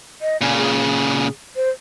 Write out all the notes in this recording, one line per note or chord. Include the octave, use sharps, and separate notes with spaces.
D#5
A#2 C#3 G#5
G#4
C5